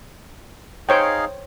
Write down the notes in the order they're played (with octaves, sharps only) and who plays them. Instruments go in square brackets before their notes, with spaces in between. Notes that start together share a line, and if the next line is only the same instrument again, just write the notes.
[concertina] D#4 G#4 F5 [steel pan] C5 C#5 G5